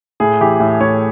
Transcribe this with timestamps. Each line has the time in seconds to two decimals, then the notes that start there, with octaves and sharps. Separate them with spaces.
0.20 A2 G#4
0.41 E3 G4
0.60 A2 A4
0.80 A2 C#5